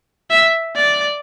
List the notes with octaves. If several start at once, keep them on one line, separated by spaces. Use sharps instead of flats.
E5
D5